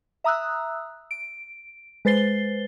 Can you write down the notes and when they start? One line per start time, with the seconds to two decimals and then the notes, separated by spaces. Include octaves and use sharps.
0.24 E5 A#5 D#6 E6 F#6
1.11 D7
2.05 G#3 B4 C5 A6 C7 G7